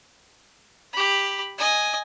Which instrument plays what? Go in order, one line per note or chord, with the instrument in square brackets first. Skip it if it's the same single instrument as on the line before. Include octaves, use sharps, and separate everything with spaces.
[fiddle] G4 B5
D#5 G#5